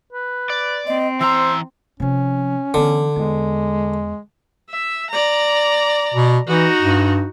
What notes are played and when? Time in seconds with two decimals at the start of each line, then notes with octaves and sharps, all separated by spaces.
0.13 B4
0.50 D5
0.87 C4 D#5
1.21 E3 C5 A#5 E6
2.00 C3 F3 C#4
2.74 D3 E3 B3
3.16 E2 G#3
4.69 E5
5.10 D5 A#5
6.14 B2
6.47 E3 D#4 F#4
6.81 G2